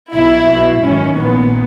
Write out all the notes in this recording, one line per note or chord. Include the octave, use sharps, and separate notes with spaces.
B1 B2 E4
B1 B2
G#1 F#2 D#3 C#4
A#1 A#2 B3